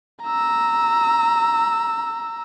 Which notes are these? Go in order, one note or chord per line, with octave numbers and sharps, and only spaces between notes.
A#5 E6